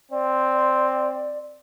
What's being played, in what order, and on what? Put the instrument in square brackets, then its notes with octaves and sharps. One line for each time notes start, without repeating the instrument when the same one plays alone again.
[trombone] C4 [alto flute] D5